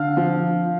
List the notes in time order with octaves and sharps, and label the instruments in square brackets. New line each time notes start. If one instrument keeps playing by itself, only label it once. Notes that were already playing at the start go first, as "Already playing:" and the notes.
Already playing: [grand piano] D3 [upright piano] F5
[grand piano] F3